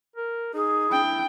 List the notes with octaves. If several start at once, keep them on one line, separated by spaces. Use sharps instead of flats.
A#4
D#4 G#4
D4 E4 G5